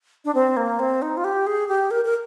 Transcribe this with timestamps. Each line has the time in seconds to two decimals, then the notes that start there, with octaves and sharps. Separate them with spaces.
0.25 D4
0.35 C4
0.57 A#3
0.79 C4
1.02 D#4
1.17 F4
1.24 G4
1.47 G#4
1.69 G4
1.91 A#4
2.05 A#4